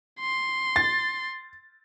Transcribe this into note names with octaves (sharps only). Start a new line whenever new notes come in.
C6
A6